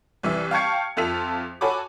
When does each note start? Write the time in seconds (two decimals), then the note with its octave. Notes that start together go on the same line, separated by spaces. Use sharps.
0.23 C2 E3 E5
0.51 F5 G5 A5 C#6 G#6 C#7
0.97 F2 F4 A4 E5 B6 F7
1.61 F#4 A4 C#5 G#5 B5 D6